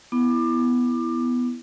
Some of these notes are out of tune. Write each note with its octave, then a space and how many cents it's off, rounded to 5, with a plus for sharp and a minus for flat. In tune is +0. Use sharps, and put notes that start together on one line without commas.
B3 +0 E4 +0 D6 +25